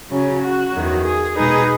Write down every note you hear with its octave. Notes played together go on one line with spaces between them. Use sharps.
C#3 F#3 C#4
F#4
E2 D#3 F#3
G#4
B2 G#3 D#4 G#4 B4